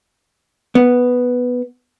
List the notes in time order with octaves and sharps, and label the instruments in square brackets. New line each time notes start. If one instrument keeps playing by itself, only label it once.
[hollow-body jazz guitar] B3